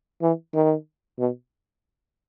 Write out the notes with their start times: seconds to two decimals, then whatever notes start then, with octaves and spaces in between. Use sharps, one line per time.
0.22 E3
0.54 D#3
1.19 B2